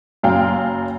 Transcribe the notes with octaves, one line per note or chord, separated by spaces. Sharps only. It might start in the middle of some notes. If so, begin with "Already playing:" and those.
F#1 F#2 F5 G5 G#5